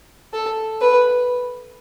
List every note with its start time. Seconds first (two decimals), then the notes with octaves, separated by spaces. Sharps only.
0.33 A4
0.81 B4